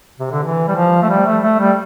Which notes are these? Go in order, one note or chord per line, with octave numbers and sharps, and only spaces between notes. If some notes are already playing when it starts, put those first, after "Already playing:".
C3
D3
E3
G3
F3
A3
G3
A3
A3
G3